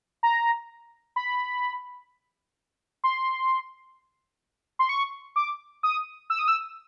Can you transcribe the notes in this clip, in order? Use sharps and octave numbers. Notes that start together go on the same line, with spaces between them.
A#5
B5
C6
C6
C#6
D6
D#6
E6
D#6
E6